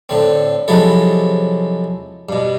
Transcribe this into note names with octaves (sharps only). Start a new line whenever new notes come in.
A2 D3 C4
C3 F3 F#3 G#3 E4 A4
G2 B2